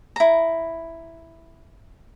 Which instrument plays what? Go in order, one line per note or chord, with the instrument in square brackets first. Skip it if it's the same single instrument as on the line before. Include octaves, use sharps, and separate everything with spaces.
[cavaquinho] E4 A#5